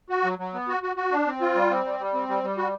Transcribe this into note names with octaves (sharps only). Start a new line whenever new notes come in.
F#4
F#3
F#3
B3
F#4
F#4
F#4
D4
C4
F4
G3
C4
G3
G3
C4
G3
G3
F#4